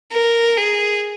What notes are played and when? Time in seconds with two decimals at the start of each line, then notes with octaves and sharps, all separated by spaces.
0.12 A#4
0.57 G#4